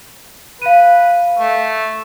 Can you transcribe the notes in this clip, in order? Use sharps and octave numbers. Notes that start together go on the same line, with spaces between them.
B4 F5 D#7
A3